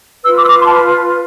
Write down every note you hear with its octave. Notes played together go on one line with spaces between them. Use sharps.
F4 B4 E6
D6
E6
D6
C6
A5
B5
B5